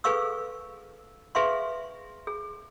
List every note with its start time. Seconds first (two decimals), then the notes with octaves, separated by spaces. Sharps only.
0.04 G#4 A4 B4 F5 C#6 E6
1.35 G#4 B4 E5 F5 C6 C#6
2.27 G#4